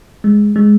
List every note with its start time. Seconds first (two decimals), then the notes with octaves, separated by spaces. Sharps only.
0.24 G#3
0.56 G#3